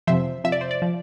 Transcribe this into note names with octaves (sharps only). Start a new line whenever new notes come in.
F2 C3 F3 C5 E5
F2 C3 F3 E5
D5
C5
D5
F3